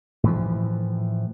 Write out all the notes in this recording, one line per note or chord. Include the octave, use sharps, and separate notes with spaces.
A2 E3 F3